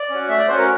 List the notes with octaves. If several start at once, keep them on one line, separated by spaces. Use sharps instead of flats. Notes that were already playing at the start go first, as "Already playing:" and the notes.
Already playing: D5
C#4 F#4
A3 E5
D5
C#4 F#4 C5
A#4